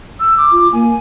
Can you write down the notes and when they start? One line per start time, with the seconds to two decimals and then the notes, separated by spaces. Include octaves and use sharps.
0.20 E6
0.37 D6
0.52 F4
0.73 A#3 G#5